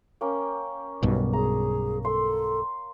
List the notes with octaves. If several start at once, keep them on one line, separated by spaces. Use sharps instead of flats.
A#3 C#4 G5
B1 G2 B2
G#4 A#5
A4 C6